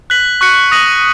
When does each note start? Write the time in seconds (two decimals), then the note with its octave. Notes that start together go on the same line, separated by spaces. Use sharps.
0.10 F#6 B6 F#7
0.41 C#6 F#6 C#7
0.71 D#6 A#6 D#7 F#7